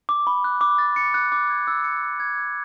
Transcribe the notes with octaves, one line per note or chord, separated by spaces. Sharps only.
D6
B5
F#6
D6
A6
C#7
F#6
D6
G#6
E6
C#7
E6
G#6
E6